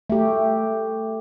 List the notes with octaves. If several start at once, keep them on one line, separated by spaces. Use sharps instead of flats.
A3 G4